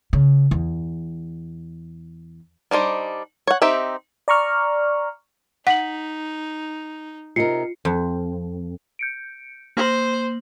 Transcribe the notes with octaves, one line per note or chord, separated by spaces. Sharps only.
C#3
E2
G3 D4 D#4 C5
C#5 F#5
C4 D#4 G4 E5
D5 A#5 C#6 F6
D#4 F#5 B6 F#7
C3 D#4 F4 A#4 C7 C#7
F2
G6 C#7 D7
A#3 C5 F#7